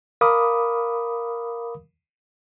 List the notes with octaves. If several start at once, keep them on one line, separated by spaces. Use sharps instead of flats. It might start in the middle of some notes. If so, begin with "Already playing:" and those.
A#4 F5 B5 D6 D#6